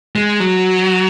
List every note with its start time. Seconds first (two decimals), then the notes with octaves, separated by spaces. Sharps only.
0.16 G#3
0.40 F#3